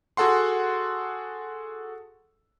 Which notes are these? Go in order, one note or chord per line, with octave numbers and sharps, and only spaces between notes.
F#4 G#4 A4 F#5 C6